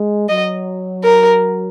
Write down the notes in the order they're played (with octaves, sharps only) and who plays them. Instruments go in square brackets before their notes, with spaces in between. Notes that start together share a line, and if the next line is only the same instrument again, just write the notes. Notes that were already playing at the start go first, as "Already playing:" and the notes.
Already playing: [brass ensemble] G#3
[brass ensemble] F#3 [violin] D#5
[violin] A#4